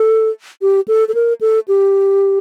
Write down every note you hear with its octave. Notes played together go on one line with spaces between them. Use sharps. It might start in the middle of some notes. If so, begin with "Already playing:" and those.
Already playing: A4
G4
A4
A4
A#4
A4
G4